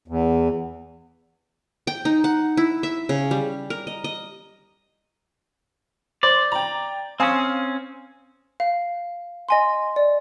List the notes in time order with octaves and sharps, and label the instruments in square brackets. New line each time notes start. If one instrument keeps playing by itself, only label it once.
[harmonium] E2
[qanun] G5
D#4
F#5
E4
E5
C#3
G3
A#4
D#5
D#5
[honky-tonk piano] C5 [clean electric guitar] D5
[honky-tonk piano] G5 A#5
[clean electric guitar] C4 C#4 [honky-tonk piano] F5 G#5 D#6
[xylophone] F5
D#5 G#5 C6
D5